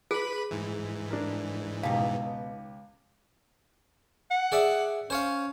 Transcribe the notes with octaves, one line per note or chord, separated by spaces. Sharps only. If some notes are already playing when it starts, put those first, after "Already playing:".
G#4 B4 B5
G#2 E3
D4 A#4
C#2 B2 D#4 G4 F5
F#5
G#4 D5 E5
C#4 C5 C#5 F5